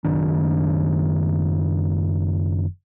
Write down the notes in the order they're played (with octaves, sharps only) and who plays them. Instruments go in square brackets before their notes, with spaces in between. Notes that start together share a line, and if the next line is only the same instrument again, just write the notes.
[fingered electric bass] F#1 D#3 D4